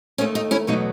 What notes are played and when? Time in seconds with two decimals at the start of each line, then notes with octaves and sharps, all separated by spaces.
0.18 D#2 D#3 A3 C#4
0.35 D#4
0.51 C#4 E4
0.67 E2 B2 F#3 A3 D#4